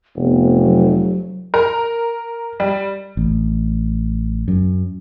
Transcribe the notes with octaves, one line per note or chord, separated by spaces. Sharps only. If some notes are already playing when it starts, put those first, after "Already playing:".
F1 B3
F#3
A#4
G3
A1
F#2